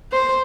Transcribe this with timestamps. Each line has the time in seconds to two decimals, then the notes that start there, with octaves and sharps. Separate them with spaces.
0.12 C5